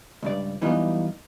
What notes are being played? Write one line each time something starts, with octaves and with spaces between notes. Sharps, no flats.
C#2 G2 D5
F#2 E3 G3 B3 D#4 F4